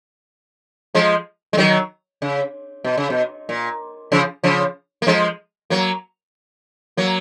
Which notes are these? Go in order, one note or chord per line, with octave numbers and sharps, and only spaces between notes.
F3 G#3
G#3
D#3 F#3
C#3
B2
C#3
B2
A#2
C#3 F3
C#3 F3
A#3
F3 G#3
F#3 A#3
F#3 A#3